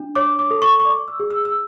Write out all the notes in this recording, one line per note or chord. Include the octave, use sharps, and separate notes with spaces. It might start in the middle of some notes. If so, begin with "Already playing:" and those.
Already playing: D4
C#5 D6
D6
A4
C#6
C#6
D5 D6
E6
G#4
E6
E6